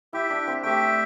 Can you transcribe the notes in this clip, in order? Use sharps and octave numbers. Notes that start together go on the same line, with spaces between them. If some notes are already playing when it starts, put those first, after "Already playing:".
E4 G4 E5 G5
D4
C4
A3 G4 E5 G5